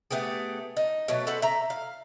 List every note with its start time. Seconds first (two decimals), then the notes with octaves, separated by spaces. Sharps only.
0.11 A3 B3 G4 G#4
0.77 D#4
1.08 B2 F#3 A3
1.27 A4 B4 C5 F#5
1.42 E5 A#5
1.70 F5